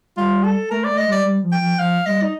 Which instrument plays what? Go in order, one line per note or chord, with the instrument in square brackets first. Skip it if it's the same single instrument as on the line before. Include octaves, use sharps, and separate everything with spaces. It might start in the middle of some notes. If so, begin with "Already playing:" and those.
[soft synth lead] G3 [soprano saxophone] F4
[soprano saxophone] A4
[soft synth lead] A3 [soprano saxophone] A#4
[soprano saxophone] D5
[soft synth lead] A3
[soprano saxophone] D#5
[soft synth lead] G3 [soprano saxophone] D5
[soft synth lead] G3
F3
[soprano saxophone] G5
[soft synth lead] F3
[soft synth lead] F3 [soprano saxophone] F5
[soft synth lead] G3 [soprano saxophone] D#5
[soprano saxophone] D#4